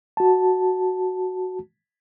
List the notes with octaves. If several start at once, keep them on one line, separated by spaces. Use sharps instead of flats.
F#4 A5